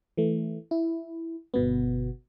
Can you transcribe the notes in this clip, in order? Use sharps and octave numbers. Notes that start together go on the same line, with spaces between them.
E3 A3
E4
G1 B2 B3